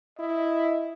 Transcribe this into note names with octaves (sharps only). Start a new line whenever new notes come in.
E4 D#5